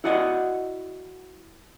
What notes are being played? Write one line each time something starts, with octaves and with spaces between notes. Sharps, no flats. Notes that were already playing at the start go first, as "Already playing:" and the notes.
E4 F#4 D5 D#5 F#5